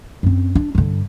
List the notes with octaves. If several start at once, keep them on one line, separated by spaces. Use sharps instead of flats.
F#2 C4
D4
G2 D3